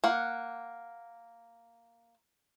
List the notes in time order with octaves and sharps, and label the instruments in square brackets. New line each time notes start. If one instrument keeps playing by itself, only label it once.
[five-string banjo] A#3 F#5